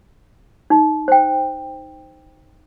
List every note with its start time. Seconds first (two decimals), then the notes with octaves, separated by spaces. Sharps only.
0.70 D#4
1.08 C5 G5